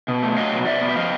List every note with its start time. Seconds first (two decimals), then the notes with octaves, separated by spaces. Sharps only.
0.08 B2
0.23 A3
0.37 F#3 D#5 F5
0.52 B2
0.66 B2 D5 E5
0.81 B3
0.89 E5
0.96 F3 D#5 F5